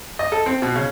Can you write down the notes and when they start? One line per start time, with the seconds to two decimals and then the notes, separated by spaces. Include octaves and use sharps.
0.19 D#5
0.32 A4
0.46 C4
0.62 B2
0.76 C#3